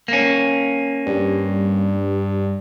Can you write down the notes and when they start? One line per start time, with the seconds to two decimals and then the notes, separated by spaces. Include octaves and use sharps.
0.08 A#3 C#4
1.06 G2